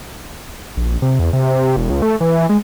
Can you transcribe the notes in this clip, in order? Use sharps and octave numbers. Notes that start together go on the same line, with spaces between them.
A#1
C3
E2
C3
E1
C#2
A3
E3
G#3